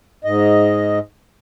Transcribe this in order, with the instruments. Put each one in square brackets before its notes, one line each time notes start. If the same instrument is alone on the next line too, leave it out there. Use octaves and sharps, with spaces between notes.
[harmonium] G#2 D#5